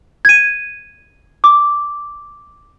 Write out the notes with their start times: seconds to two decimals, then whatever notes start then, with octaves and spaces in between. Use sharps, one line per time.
0.25 G#6 D#7
1.44 D6